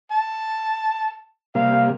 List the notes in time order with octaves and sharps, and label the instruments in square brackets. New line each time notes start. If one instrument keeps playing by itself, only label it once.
[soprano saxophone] A5
[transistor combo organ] C3 G3 A#3 [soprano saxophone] F5